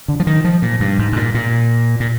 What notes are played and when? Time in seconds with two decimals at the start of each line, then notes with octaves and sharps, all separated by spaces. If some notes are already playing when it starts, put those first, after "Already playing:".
0.08 D3
0.20 F3
0.27 D#3
0.44 F3
0.62 A#2
0.80 G2
0.99 G#2
1.13 G#2
1.16 A#2
1.34 A#2
2.00 A#2